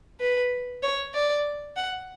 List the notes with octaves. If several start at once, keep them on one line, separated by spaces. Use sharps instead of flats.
B4
C#5
D5
F#5